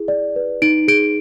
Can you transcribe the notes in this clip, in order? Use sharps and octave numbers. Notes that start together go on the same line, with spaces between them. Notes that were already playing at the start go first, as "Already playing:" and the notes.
Already playing: E4 G#4
D5
B4
D#4 D7
G#4 D7